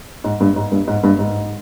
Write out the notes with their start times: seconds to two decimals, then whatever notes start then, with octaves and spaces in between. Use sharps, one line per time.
0.24 G#2
0.40 G2
0.56 G#2
0.72 G2
0.87 G#2
1.03 G2
1.19 G#2